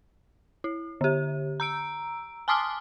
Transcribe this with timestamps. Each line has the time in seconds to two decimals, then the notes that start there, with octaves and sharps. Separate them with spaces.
0.64 E4
1.01 D3 G4
1.60 A#5 E6 D7
2.48 G#5 A5 C6 D6 D#6 F6